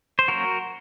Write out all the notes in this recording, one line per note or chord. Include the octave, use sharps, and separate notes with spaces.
C5
F#3 A#3 C#4 F#4 A#4